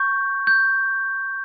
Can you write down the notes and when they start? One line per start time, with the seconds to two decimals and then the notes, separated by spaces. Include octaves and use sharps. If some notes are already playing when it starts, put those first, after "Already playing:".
Already playing: C#6 G6
0.47 G6